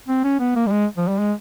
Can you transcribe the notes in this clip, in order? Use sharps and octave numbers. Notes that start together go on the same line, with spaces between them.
C4
C#4
B3
A#3
G3
G#3
F3
G3
G#3